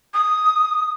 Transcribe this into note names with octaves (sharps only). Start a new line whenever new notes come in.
D#6